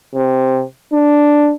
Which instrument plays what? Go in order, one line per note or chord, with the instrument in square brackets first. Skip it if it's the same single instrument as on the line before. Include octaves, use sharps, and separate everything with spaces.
[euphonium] C3
D4